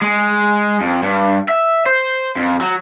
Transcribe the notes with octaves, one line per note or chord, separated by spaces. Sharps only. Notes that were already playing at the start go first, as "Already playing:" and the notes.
G#3
F2
G2
E5
C5
F2
F#3